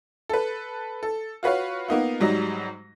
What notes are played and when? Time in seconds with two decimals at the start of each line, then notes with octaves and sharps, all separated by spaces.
0.29 A4 B4
1.03 A4
1.43 F4 F#4 B4 C#5 F5
1.88 A#3 B3 D#4 F4
2.20 G#2 F#3 G3 D#4 A#6